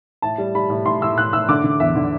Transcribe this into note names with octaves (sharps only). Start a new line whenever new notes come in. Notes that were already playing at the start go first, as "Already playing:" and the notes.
A2 A5
G3
G3 B5
A2
A2 C6
A2 E6
A2 F#6
A2 E6
D3 D6
D3
E2 E5
D3